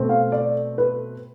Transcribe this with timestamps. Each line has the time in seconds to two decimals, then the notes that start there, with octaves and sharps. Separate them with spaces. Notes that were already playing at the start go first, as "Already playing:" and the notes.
Already playing: B2 A3 C4
0.09 F5
0.32 D5
0.78 B4